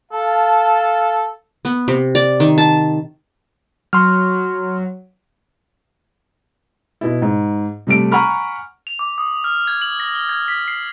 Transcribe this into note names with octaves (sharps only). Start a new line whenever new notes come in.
A4 F5 A5
B3
C3
D5
D#3
A5
F#3 C6 F6
B2 E4
G#2
C3 G3 A3 D7
F#5 G#5 A#5 B5 C#6 F6
F7
D6
D#6
F6
G#6
F#7
A#6
G7
G#6
B6
C7